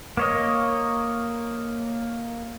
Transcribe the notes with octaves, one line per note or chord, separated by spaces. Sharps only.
A#3 C#5 D#5